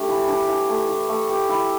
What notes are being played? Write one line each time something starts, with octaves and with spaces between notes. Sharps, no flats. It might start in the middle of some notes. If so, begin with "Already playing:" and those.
Already playing: G3 A3 D4 G4
E3
D4
E3
A3
E3
A3
G4
E4